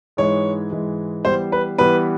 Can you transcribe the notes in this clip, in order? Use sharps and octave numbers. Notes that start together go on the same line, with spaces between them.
G#2 E3 G#3 C#5
G#2 E3 G#3
E3 G3 B3 C5
B4
E3 G3 B3 B4